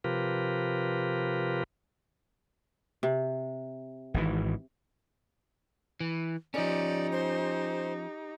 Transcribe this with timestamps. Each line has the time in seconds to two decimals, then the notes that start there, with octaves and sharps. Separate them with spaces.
0.04 C3 F3 F4 G4 A#4 B4
3.03 C3
4.14 G#1 G#2 E3
6.00 E3
6.54 F3 C#4 D#4 G4 D5
7.12 C5